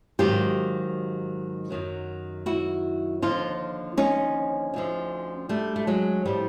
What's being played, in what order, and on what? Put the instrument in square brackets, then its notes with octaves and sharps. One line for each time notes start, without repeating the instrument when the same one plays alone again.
[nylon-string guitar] G#2 D#3 F#3 F4 G4
F#2 D#3 F#3
E4 F#4
D#2 D3 F3 D#4 F4
C#4 D#4
D2 D3 F3
G3 A3
A3
F#3 G#3
A2 F3 G3